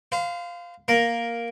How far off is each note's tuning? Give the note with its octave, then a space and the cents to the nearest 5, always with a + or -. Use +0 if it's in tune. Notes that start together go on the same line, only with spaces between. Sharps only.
C5 -35 F5 +0
A#3 +0 A#4 +5